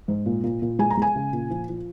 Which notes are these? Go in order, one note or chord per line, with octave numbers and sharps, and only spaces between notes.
G#2
A#2
A#2
A#2
G#3 G#5
A#5
G#3 G#5
C#3
A#2
F3
F3